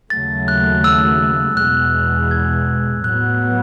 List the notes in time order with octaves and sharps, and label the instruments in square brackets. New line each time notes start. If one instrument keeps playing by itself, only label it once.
[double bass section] D#2 C#3 F#3 A3 [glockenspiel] A6
[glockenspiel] F#6
E6
[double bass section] E2 B2 G#3 [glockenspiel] F#6
[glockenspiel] G#6
[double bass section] A2 F#3 B3 [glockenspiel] F#6